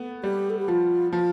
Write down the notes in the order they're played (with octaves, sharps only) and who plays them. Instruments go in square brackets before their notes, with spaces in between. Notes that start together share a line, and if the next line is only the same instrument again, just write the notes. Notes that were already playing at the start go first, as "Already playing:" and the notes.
Already playing: [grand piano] A3 B3
[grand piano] G3 [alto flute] G4
[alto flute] A4
G4
[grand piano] F3 [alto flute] F4
[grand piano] F3 [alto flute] F4